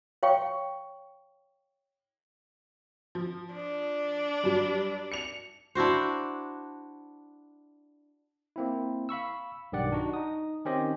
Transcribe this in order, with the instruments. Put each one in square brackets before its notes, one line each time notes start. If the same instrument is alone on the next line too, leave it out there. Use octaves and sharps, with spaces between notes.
[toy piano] C#5 F5 G5 C#6
[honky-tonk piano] F3
[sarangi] D4
[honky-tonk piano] G2 F#3 G3
C#7 F7
[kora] D4 E4 F#4 C5
[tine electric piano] A#3 C4 E4
F5 B5 C#6 E6
B1 G2 D#3 G4 D5 F#5
D4 D#4 F#4
D#4 D#6
D#3 C4 C#4 G4 C5 D#5